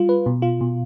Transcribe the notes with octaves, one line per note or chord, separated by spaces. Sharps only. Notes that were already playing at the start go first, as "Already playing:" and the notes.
Already playing: G3 F4
B4
B2
F4
B2